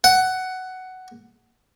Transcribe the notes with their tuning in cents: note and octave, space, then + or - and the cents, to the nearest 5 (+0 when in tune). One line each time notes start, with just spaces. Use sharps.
F#5 +10